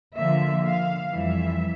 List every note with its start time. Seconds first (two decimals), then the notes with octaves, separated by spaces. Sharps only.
0.15 D3 F3 A#3 E5
0.64 F5
1.13 F2 E3 G3 E5